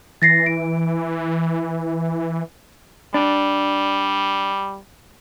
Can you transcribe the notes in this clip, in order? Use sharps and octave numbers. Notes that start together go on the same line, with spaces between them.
E3 A6 A#6 C7
D7
G3 D4